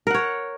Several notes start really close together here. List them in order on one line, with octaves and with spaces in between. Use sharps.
A#4 F#5 C#5